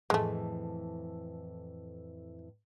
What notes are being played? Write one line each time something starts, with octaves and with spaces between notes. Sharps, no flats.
F2 A2 E3 G#3 A3